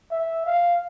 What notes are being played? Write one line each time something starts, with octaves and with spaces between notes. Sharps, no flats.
E5
F5